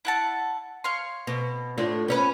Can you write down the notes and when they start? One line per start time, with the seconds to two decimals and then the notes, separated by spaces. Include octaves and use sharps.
0.05 E4 F#5 A5
0.84 C#5 F5 C6
1.27 B2
1.78 A2 D4 F4
2.08 B3 C#4 B4